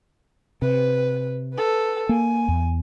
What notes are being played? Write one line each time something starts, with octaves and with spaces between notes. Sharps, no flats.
C3 B4
A4 B4
A#3 G#5
E2